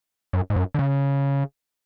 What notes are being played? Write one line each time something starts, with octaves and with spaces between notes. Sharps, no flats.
F#2
G#2
F#2
D3
C#3